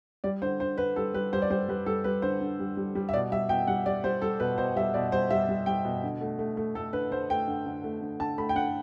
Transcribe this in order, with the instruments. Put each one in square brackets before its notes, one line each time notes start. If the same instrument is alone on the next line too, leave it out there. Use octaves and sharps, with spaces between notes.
[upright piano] G3 D5
D3 C5
D3 C5
D3 B4
G3 A4
G3 B4
G3 C5
D5
G3 C5
G3 B4
G3 A4
G3 B4
D3 C5
D3
G3
G3
G3
E5
B2 D5
G3 E5
B2 G5
G3 F#5
G3 D5
G3 C5
G3 A4
B2 B4
B2 C5
G3 E5
B2 D5
G3 C5
G3 E5
G3
G3 G5
B2
D3
A3
A3
A3
A3 A4
D3 B4
D3 C5
A3 G5
D3
D3
A3
D3
D3 A5
A3 B5
G5
D3 F#5